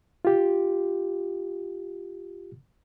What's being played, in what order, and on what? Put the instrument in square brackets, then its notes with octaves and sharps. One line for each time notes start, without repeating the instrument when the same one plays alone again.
[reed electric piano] F4 G4